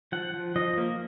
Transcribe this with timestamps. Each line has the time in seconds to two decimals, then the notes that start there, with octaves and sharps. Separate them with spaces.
0.12 F3 F#5
0.34 F3
0.56 F3 D#5
0.78 A#3